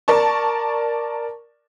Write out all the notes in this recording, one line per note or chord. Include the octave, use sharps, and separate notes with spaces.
A#4 D5 A5 C#6